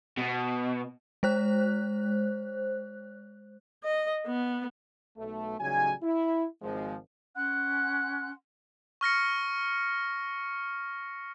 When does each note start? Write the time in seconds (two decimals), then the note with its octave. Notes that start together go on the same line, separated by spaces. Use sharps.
0.18 B2
1.23 G#3 C5 F#6
3.84 D#5
4.27 B3
5.18 B1 A3
5.60 A1 C#3 F#3 G3 D#4 G#5
6.03 E4
6.62 G#1 F3 G#3
7.36 C#4 F#5 C6 F#6
9.01 C#6 F6 A#6 C#7